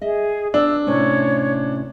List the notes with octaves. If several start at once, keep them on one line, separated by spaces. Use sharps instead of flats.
G#4 D#5 E5
B3 D4 E6
A2 C3 C#4 C#5